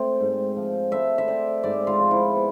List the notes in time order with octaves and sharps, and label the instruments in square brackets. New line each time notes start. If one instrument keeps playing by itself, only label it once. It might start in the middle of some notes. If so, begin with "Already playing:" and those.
Already playing: [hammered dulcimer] A3 C4 D5
G#2
F3
A3 E5
E5
C4 D5
G#2 D5
F4
F3
E4
B3